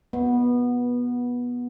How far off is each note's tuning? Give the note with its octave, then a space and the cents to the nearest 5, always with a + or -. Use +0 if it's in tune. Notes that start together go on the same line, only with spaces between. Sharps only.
B3 -15